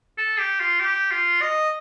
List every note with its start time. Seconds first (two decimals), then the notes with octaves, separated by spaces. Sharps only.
0.18 A4
0.39 G4
0.60 F4
0.80 G4
1.11 F4
1.42 D#5